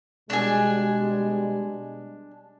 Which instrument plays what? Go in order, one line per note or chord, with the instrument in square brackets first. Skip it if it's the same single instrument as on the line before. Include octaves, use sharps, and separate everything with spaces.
[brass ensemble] B2 G3 G#3 [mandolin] D4 G#5